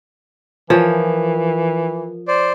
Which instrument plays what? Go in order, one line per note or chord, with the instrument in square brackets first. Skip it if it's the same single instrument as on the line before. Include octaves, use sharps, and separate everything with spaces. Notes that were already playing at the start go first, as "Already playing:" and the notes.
[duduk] E3 [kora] F3 C#5 [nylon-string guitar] A#4 G#5
[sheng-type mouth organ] C5 D5